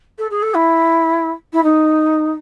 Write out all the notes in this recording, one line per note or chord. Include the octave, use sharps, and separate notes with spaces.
A4
G#4
A4
E4
E4
D#4